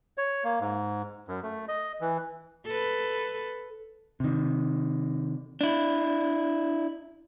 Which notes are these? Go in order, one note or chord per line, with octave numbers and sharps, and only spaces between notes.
C#5
A#3
G#2
F#2
A3
D#5
E3
A4 B4
C3 D#3
D4 E4